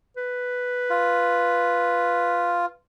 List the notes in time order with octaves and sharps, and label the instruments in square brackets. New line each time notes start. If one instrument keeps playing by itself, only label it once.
[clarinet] B4
[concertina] F4